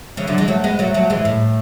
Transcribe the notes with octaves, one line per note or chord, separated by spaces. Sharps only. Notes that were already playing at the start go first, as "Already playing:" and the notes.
C#3 E3
D3 F#3
E3 G#3
F#3 A3
G#3 B3
F#3 A3
F#3 A3
E3 G#3
A2